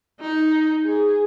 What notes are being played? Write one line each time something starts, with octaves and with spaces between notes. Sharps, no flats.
D#4
G#4